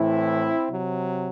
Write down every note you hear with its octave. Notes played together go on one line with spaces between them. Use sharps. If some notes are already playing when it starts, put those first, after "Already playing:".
Already playing: A2 E3 C4 E4
C3 F#3